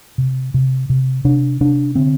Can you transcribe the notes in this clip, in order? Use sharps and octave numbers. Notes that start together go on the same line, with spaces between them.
C3
C3
C3
C3 D4
C3 D4
D3 C4